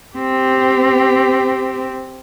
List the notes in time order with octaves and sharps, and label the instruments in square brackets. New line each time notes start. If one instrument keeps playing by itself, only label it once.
[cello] C4 G4